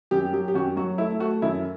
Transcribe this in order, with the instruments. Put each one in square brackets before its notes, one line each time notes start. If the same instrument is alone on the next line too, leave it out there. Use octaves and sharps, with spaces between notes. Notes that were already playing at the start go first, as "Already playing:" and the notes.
[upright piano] F#2 G4
F#3 G4
G4
F#2 F#4
F#3 F#4
A3 E4
A3 F#4
F#2 E4